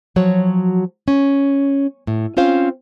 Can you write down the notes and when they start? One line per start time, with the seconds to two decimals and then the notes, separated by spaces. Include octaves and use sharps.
0.16 F3 F#3 F#4 C#5
1.08 C#4
2.07 A2
2.37 C4 C#4 F4 C5 F5